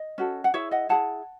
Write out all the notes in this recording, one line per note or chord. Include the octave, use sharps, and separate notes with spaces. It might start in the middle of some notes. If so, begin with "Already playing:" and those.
Already playing: D#5
C#4 F#4 A4
F#5
E4 G#4 C#5 E5
D#5 F#5
E4 G#4 F#5 A5